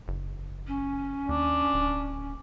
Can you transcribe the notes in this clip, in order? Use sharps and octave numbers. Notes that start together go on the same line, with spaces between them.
F#1
C#4
D#2 D4
D1